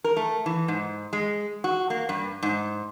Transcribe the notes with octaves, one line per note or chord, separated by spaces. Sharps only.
A#4
A3
E3
G#2
G#3
F#4
A#3
G2
G#2